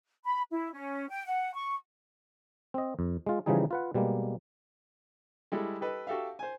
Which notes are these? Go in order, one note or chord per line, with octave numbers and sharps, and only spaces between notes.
B5
E4
C#4
G5
F#5
C#6
C4 D#5
F2
G#3 F4
C#3 E3 F3 G3 D#4 G#4
F4 B4 F#5
B2 G3 G#3 A#3
G3 G#3 E4 A4
G4 A4 B4 D#5
F#4 G4 A4 E5 F5
C5 G#5